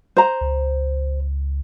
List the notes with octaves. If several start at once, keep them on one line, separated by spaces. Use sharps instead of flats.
C5 A#5
C#2